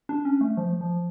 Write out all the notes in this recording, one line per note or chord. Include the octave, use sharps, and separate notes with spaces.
D4
C#4
A3
F3
F3